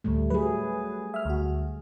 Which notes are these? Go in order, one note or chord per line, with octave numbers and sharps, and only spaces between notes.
D2 A2 G3 A3
F#3 G#4 B4
E5 F6
D2 F#4